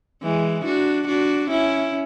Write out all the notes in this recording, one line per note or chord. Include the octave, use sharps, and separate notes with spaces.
E3 G#3
D4 F#4
D4 F#4
C#4 E4